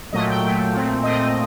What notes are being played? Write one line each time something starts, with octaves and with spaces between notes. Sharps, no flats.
A#2 F#3 A3 D#5
G5
A#2 F#3 A3
A#2 A3 C4
A#2 A3 C4 D#5